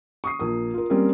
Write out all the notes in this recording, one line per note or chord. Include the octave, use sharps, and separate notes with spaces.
C#6 D#6 C7
A#1 A#4 D#6
F4 A#4
G3 A#3 C4 C#4 A#4